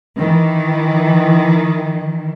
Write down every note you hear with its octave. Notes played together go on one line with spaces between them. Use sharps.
D#3 E3